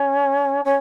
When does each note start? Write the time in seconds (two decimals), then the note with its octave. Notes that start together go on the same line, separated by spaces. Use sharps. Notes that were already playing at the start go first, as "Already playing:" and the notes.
Already playing: C#4
0.64 C#4